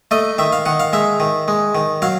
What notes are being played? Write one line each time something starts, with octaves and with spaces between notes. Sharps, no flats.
A3 D#5
D#3 E5
F5
D#3 F#5
F5
G#3 E5
D#3
G#3
D#3
F#3 F5